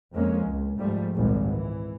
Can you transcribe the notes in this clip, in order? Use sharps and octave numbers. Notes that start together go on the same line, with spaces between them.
F2 G#3 A#3 C#4
C#2
G#2 F3 G3 A3
G#1 C#2 A#2 G3 G#3
E3